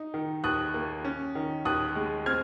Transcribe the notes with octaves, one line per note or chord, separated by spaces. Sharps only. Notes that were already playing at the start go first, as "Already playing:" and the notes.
Already playing: D#4
D#3
D#2 D#6 F#6
A#3
C#4
D#3
D#2 D#6 F#6
G#3
C4 F6 G#6